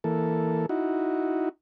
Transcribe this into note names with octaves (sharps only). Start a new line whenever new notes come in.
E3 A#3 A4
D#4 E4 F#4